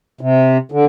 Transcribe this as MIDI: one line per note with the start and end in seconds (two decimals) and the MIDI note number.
0.21 0.57 48
0.72 0.85 50